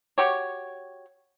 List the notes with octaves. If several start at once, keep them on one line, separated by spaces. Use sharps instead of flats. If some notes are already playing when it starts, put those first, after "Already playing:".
F#4 G4 C#5